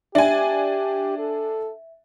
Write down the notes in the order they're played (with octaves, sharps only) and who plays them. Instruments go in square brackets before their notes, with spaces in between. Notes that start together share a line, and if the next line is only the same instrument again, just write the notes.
[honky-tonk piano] D4 G#5 [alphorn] G4 [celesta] E5
[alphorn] A4